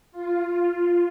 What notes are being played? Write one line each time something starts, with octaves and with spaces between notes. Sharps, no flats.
F4